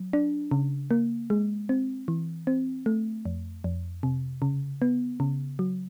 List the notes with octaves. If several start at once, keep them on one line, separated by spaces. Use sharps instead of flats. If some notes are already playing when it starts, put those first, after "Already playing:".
Already playing: F#3
D4
C#3
A#3
G#3
C4
E3
C4
A3
F2
F2
C3
C#3
B3
C#3
F#3